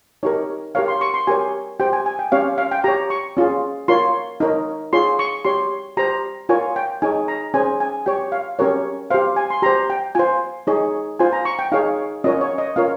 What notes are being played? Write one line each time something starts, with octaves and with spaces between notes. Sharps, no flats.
D#4 G4 A#4 C#5
G4 A#4 C#5 F5
C6
C#6
C6
G4 A#4 C#5 G#5
G4 C5 G5
G#5
G#5
G5
C#4 G4 C#5 F5
F5
G5
G4 C#5 A#5
C#6
C#4 F4 G#4
F4 A#4 C#5 C6
D#4 A#4 C#5
F4 G#4 C#5 C6
C#6
G4 C#5 C6
G4 C5 A#5
F4 A#4 C#5 G#5
G5
D#4 G#4 C#5 G#5
A#5
C#4 G#4 C5 G#5
G#5
G4 C#5 G5
F5
C#4 G4 A#4 C#5
G4 C5 F5
G#5
C6
G4 C5 A#5
G5
F4 C5 G#5
D#4 G#4 C#5
F4 C5 G#5
A#5
C#6
G5
D#4 G#4 C#5 F5
C#4 F4 A#4 C#5 D#5
C#5
D#5
C#4 F4 A#4 C#5 F5